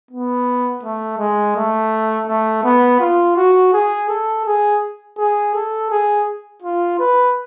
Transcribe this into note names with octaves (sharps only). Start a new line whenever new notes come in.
B3
A3
G#3
A3
A3
B3
F4
F#4
G#4
A4
G#4
G#4
A4
G#4
F4
B4